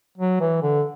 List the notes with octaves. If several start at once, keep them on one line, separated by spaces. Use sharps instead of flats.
F#3
E3
D3